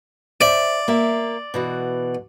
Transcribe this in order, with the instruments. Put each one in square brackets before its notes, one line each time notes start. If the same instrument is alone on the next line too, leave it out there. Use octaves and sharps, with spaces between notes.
[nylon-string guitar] C5 E5 [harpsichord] D5
[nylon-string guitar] A#3 E5
B2 E3 F#4